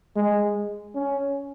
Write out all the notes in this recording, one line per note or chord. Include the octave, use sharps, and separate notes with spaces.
G#3
C#4